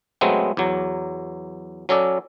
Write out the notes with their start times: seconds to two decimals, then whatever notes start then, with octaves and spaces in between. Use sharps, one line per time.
0.21 F#3 G#3 A3 B3 C4
0.57 E2 F#3
1.89 F#3 C#4 A4 D5